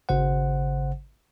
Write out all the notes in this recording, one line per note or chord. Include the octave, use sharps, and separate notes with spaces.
G#1 C#3 C5 F#5